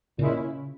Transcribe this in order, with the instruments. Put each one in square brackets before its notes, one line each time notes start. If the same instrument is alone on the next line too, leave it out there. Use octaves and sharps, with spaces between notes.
[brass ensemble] A#2 G#3 C#4 E4 [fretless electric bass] C#3